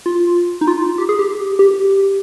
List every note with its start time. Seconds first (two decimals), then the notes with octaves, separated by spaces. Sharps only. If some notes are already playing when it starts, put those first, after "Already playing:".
0.06 F4
0.61 D#4
0.68 F4
0.98 G4
1.09 G#4
1.19 G4
1.59 G4